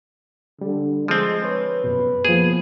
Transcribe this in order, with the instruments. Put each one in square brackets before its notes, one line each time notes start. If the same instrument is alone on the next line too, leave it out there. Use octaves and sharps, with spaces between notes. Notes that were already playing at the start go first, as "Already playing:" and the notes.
[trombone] D3 [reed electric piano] G3
[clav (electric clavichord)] F3 C4 [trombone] G#3
[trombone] B4 [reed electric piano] C#5
[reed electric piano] F#2 B2
[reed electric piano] F3 A#3 B3 [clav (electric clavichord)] G#4